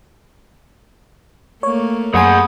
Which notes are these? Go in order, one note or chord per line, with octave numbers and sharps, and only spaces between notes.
A3 A#3 C#5
F#2 G#4 F#5 G#5 B5 D#6